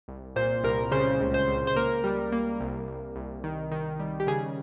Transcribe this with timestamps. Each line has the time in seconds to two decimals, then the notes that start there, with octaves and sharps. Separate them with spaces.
0.08 C2
0.36 A#2 C5
0.64 C2 A#4
0.92 C#3 C5
1.20 C#2
1.34 C5
1.48 C#2
1.67 C5
1.76 A#3 A#4
2.04 G3
2.32 A#3
2.60 C2
2.87 C2
3.16 C2
3.44 D#3
3.71 D#3
3.99 G3
4.20 G4
4.27 C#3 G#4